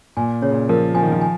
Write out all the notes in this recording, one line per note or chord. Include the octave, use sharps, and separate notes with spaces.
A#2 G#5
C#3 C#5
A#2
F3 A#4
F3 G#5
D#3
F3
G#5